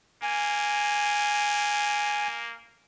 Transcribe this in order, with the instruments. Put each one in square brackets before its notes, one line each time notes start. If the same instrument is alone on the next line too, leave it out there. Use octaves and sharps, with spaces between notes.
[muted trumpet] A#3 [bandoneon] G#5